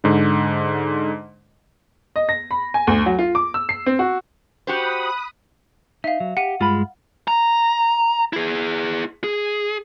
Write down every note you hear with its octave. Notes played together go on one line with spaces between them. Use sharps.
G#2 D3
D#5
A#6
B5
G#5
D2
F#3
F4
D6
E6
C7
C4
F#4
F#4 G4 C5 B5 D#6 F#6
D#4 E5 F5
F#3
G4 F#5 D#7
G2 G#3 F4 B5
A#5
E4 G#4
G#4